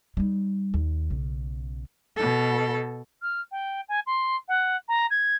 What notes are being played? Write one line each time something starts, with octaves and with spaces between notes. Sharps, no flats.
G3 D#4
D#2
B1 C#3
B2 A4
F6
G5
G#5
C6
F#5
A#5
G#6